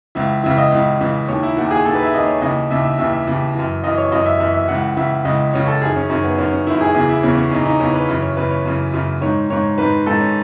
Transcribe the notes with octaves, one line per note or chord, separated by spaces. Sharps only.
C#2 C#3 E3 E5
C#2 C#3 E3 E5
D#5
C#2 C#3 E3
C#2 C#3 E3
D#2 D#3 C#5
E4
D#2 D#3 F#4
G#4
D#2 D#3 A4
B4
E5
D#2 D#3 D#5
C#5
D#2 C#3 E3 D#5
D#2 C#3 E3 E5
E5
D#2 C#3 E3 E5
E5
D#2 C#3 E3
F#2 E3
F#2 E3 D#5
C#5
F#2 E3 D#5
E5
F#2 E3 E5
E5
C#2 C#3 E3 F#5
C#2 C#3 E3 E5
C#2 C#3 E3 D#5
C#2 C#3 E3 C#5
A4
F#2 D#3 G#4
C#4
F#2 D#3 C#4
B3
F#2 D#3 C#4
C#4
F#2 D#3 E4
G#4
E2 C#3 E3 G#4
E4
E2 C#3 E3 C#4
C#4
E2 C#3 E3 D#4
D#4
E2 C#3 E3 C#4
B4
F#2 C#3 E3
C#5
F#2 C#3 E3 B4
C#5
F#2 C#3 E3
F#2 C#3 E3
G#2 D#3 C#5
G#2 D#3 C#5
G#2 D#3 B4
G#2 D#3 A4
C#4